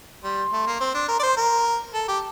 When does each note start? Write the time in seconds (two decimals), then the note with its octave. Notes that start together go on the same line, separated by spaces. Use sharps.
0.24 G3 C6
0.53 A3
0.67 A#3
0.81 C4
0.94 D4
1.09 A#4 C6
1.20 D5
1.23 C5
1.37 A#4
1.94 A4 A5
2.08 G4